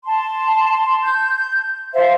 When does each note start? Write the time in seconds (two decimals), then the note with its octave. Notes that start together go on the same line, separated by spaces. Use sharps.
0.05 A5 C6
1.04 G6
1.93 C5 E5 F5